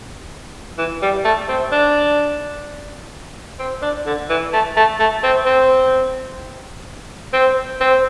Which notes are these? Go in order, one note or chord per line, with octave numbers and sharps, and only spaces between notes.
E3
G3
A3
C4
D4
C4
D4
D3
E3
A3
A3
A3
C4
C4
C4
C4